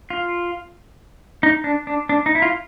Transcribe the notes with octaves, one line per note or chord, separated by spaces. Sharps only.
F4
D#4
D4
D4
D4
D#4
E4
F4